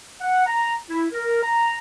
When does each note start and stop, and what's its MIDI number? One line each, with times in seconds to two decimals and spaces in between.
0.21 0.46 78
0.47 0.73 82
0.90 1.06 64
1.13 1.42 70
1.43 1.77 82